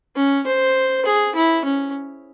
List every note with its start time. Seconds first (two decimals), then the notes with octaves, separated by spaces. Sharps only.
0.16 C#4
0.47 C5
1.06 G#4
1.35 E4
1.65 C#4